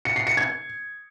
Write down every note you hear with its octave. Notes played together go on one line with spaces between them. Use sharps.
C#7
C7
C#7
G#6